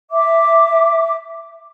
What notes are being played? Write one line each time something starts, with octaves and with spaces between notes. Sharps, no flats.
E5 D6